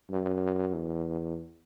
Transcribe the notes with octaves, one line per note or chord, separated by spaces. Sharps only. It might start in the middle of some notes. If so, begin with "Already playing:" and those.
F#2
E2